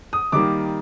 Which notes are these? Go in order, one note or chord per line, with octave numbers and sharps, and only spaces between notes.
D#6
D#3 G3 A#3 D6